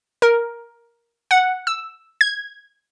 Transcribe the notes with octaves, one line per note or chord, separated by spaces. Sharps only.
A#4
F#5
E6
G#6